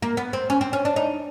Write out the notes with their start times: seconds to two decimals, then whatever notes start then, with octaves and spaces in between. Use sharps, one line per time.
0.02 A#3
0.17 B3
0.33 C4
0.50 C#4
0.61 C4
0.73 C#4
0.85 D4
0.96 D#4